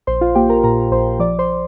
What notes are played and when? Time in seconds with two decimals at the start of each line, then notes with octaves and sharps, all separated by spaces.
0.07 A#1 C5 C6
0.21 F4 F5
0.35 A#3 G4 G5
0.49 A#4 A#5
0.64 A#2 A#4 A#5
0.92 A#1 C5 C6
1.19 F3 D5 D6
1.39 C5 C6